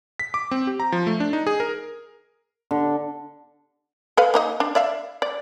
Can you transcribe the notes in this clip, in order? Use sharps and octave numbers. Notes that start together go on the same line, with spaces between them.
B6
D6
C4
G4
A#5
F3
A3
D4
D#4
G#4
A#4
D3
A4 B4 F5
A#3 D#4 D#5
D4
D5 E5 F5
D5